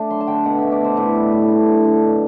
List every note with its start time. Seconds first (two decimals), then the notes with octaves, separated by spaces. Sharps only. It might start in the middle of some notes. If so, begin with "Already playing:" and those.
Already playing: A3 D4
0.10 F#3 C6
0.21 A5
0.27 D3 G5
0.45 B2 F#5
0.58 A3 E5
0.72 D5
0.80 B2 C5
0.97 A2 B4
1.15 G3
1.32 A2
1.50 D3
1.67 F#3
1.84 D3
2.02 B2